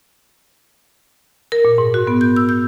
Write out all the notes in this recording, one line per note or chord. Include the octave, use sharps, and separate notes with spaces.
A#4
A#2
G#2
F#4
B3
G6
E6
G6